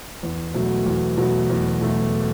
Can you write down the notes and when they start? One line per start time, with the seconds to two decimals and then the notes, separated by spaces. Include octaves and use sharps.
0.23 E2
0.54 B2 F#3 A3
0.86 E2
1.18 B2 F#3 A3
1.50 E2
1.81 B2 F#3 A3